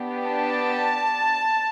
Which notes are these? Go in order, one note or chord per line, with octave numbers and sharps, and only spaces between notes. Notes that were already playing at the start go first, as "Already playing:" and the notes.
Already playing: B3 D4 G4
A5